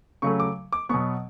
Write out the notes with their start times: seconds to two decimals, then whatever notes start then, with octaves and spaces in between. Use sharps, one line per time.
0.22 C#3 F#3 A3 C#6
0.40 D6
0.73 D6
0.89 B2 F#3 B3 C#6